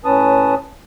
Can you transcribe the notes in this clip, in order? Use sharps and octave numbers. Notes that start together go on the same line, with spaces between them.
A2 C#4 B4 A5 D#6